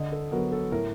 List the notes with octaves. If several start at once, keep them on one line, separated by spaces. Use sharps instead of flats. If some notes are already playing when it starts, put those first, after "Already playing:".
Already playing: D3 D#5
A4
F#3 B3 A#4
A4
A2 A#4